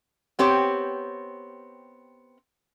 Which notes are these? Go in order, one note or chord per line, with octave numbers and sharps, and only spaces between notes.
B3 C4 G4 C#5